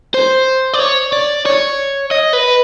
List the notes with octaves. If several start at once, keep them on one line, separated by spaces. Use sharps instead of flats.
C5
D5
C#5
D5
C#5
D#5
B4